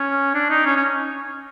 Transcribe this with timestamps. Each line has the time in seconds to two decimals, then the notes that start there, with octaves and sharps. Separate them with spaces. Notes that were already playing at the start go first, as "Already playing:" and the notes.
Already playing: C#4
0.34 D4
0.50 D#4
0.65 C#4
0.76 C#4